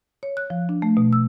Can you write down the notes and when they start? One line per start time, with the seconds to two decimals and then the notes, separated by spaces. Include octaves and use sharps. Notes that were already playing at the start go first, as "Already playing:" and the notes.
0.23 C#5
0.37 F#6
0.50 F3
0.69 D4
0.82 A3
0.97 B2
1.13 E6